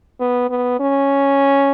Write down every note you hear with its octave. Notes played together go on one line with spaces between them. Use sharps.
B3
B3
C#4